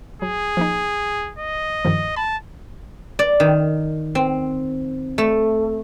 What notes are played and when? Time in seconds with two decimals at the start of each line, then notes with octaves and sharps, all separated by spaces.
0.22 F#3 G#4
0.57 F3 A#3 D#4
1.38 D#5
1.85 G2 D#3 F3
2.16 A5 B5
3.19 D5
3.40 D#3
4.15 C4
5.18 A3